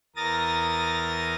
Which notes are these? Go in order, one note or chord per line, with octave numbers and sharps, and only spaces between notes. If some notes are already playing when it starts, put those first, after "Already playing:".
E2 A#4 D#6 A6 A#6